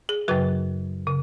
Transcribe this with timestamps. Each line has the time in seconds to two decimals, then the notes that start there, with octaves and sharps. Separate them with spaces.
0.09 G#4
0.28 F#2 C#3 F#3 F#4 B4
1.07 C#3